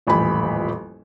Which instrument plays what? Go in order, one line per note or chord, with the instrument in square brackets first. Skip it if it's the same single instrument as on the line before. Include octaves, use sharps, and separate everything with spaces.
[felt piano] D#1 A1 F2 G#5 B5